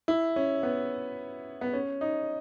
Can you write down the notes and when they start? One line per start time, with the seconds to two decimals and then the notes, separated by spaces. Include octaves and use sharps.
0.08 E4
0.36 C#4
0.63 B3
1.61 B3
1.73 C#4
2.01 D#4